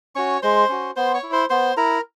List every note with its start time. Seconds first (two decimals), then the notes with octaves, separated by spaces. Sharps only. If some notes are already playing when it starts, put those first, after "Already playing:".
0.15 C#4 F#4 C#5 C#6
0.42 G#3 C5 C6
0.69 C#4 F#4
0.96 B3 C5 C6
1.14 C#5 C#6
1.23 E4
1.32 C5 C6
1.50 B3 C5 C6
1.77 E4 A#4 A#5